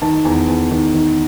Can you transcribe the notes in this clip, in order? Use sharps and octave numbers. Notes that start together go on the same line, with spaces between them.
D#3 A5
E2
E2
D#3
D#3